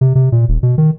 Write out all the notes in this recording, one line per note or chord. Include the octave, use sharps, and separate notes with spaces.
C3
C3
A#2
D#1
B2
D#3